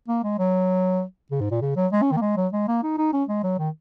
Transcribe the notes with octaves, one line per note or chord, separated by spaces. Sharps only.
A#3
G#3
F#3
C#3
G#2
A#2
C#3
F#3
G#3
C#4
D#3
A#3
G#3
F#3
G#3
A#3
D#4
D#4
C#4
G#3
F#3
D#3